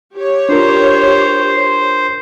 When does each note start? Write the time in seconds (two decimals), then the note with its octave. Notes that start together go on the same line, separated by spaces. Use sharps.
0.14 G4 C#5
0.49 D4 F4 A#4 C5